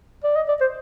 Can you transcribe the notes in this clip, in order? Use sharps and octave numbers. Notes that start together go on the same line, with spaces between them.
D5
D#5
D5
C5